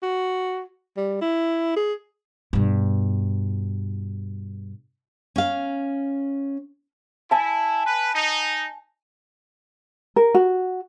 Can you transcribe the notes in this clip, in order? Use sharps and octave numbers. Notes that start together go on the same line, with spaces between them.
F#4
G3
E4
G#4
G2 B2
C#4 F5
E4 G#5 A5
B4
D#4
A#4
F#4